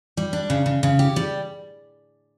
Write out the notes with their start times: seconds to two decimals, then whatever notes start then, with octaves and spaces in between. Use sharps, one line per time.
0.17 G3
0.33 D4
0.50 C#3
0.66 C#3
0.83 C#3
0.99 G4
1.16 G3